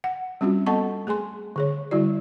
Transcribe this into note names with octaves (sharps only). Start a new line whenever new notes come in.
F#5
G3 C4 C#4 F4 F#4
B3 A4 D#5 F#5 A5 C#6
A3 G#4 G#5 C6
D3 G#4 C#5
D3 G3 E4 F#4 D5